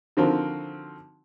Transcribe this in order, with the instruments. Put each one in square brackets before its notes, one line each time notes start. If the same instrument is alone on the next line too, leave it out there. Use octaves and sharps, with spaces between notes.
[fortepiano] D3 D#3 F3 C4 F#4 A#4